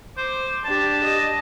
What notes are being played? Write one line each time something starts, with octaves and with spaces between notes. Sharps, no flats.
C5 D6
D4 G4 A5
D#5